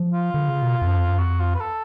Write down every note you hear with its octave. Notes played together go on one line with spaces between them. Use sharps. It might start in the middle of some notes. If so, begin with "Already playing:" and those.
Already playing: F3
F4
D3
C#3
B2
F2
F#2
F2
F#2
F2 F#4
F4
B4
A4